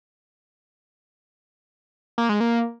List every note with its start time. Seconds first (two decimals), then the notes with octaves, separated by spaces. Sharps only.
2.18 A#3
2.29 G#3
2.41 A#3